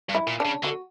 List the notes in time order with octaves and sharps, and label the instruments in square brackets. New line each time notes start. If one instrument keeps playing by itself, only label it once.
[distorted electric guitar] G2
[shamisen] E4
[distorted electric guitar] A#2
[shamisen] D4
[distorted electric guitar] C#3
[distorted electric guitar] D3 [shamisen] F#4